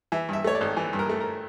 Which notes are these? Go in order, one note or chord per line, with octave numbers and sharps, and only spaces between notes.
E3 E5
G2 E5
A3 C#5
D5
G#1
E3
G2
A#4
A3
A#4